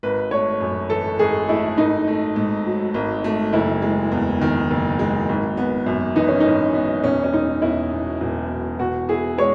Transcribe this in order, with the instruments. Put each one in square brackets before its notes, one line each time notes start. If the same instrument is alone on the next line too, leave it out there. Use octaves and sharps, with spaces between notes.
[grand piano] G#1 [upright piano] B4
[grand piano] A3 [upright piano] C#5
[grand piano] F#2
[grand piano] E3 [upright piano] A4
[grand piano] G#1 [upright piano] G#4
[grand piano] A3 [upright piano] E4
[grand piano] G#1 [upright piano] D#4
[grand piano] A3
G#2
F#3
G#1
A3
[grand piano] F#1 [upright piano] E4
[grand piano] G#3
E2
D#3
F#1
G#3
G#1
B3
F#2
[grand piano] E3 [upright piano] D#4
[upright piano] C#4
D#4
[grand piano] G#1
B3
[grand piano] E1 [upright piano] C#4
[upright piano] C#4
[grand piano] E1 [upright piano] D#4
[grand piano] E2 [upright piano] E4
[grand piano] B2
E1
E1
[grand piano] B2 [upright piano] F#4
[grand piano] E4 [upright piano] G#4
[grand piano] G#3 [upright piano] C#5